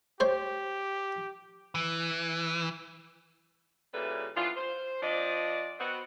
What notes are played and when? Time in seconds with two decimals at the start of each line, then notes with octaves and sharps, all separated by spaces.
0.20 G4 C5 C#5
1.75 E3
3.93 A#2 C#3 G3 E4 A4 B4
4.36 E3 B3 D4 F4
4.57 C5
5.02 F3 C4 D4 D5 D#5
5.79 B3 C4 F#4